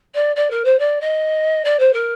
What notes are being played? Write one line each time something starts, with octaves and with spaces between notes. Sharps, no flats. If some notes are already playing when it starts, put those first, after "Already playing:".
D5
D5
A#4
C5
D5
D#5
D5
C5
A#4